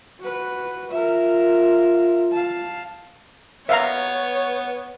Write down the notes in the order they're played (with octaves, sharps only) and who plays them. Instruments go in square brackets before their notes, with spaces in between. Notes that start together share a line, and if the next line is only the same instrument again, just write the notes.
[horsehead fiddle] F#4 B4
[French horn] F4 [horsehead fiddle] A#4 E5
[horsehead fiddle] F5 A5
[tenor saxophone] B3 [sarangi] C#5 [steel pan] E5 F5 A#5